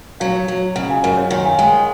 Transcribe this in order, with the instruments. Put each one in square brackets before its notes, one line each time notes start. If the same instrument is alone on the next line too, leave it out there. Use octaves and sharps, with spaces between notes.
[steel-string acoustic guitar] F#3 [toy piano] C#5 F5
[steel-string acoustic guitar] F#3
[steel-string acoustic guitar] C#3 [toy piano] D#5 F#5
[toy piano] F5 G#5
[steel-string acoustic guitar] F#2 [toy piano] D#5 F#5
[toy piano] C#5 F5
[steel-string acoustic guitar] D#3 [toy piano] D#5 F#5
[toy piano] F5 G#5
[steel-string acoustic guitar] G#3 [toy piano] F5 G#5
[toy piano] D#5 F#5